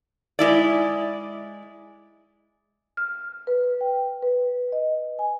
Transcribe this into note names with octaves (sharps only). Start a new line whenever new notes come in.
G#3 E4 D5
F6
B4
G5
B4
D#5
G#5